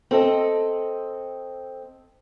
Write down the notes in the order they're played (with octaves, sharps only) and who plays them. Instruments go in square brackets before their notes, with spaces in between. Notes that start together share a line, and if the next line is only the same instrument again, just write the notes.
[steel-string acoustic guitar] C4 A4 D#5